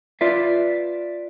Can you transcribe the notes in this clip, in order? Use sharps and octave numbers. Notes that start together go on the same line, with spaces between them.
F4 B4 D5 E5